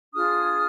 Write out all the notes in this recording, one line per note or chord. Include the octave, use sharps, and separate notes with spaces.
D4 F4 G#4 D#6 F6